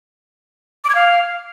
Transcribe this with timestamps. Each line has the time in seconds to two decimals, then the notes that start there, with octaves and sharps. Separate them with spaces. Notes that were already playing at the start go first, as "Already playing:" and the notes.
0.84 D6
0.90 G#6
0.95 F5